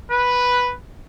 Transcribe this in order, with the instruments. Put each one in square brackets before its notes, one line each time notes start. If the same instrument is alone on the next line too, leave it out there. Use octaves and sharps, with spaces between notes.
[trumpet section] B4